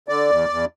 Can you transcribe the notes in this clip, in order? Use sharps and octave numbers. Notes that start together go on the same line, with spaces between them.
D3 D5
E2
E2